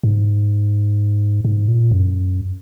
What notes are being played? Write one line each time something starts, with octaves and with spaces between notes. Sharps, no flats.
G#2
G#2
A#2
F#2